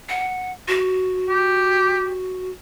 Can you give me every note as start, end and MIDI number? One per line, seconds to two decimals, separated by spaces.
0.09 0.52 78
0.68 2.50 66
1.29 2.12 67